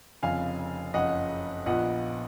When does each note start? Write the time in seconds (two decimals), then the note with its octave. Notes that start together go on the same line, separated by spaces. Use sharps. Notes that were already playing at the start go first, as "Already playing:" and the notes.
0.23 F1 F2 C#3 F5 G#5
0.94 F#1 F2 C#3 D#5 F#5
1.66 A#1 A#2 F3 B3 D#5 F#5